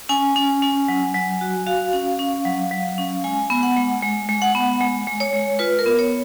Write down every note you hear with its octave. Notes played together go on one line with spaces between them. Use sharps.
C#4 G#5
C#4
C#4
F#3
F#3
F#4
F#4 F5
C#4
C#4
F#3
F#3
C#4
G#3 G#5
B3
F#5
G#3
G#3
G#3
F#5
B3
G#3
G#3
C#5
G#3
F4 B4
A#4
B3
C#5